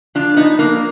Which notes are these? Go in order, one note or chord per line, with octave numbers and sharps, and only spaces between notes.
F3 D4 F4
F3 B3 D#4
F3 A#3 D4